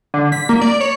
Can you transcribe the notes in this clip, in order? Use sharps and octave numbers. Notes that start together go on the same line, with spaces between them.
D3
B6
A#3
D5
C#5